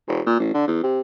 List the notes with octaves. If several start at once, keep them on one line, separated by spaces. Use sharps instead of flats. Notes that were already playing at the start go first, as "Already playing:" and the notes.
E1
A#2
A1
D3
E2
C3